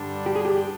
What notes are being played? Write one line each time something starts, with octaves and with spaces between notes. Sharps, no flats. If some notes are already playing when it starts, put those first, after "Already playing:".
Already playing: G2 D3 G3 D4
G4
G#4
G4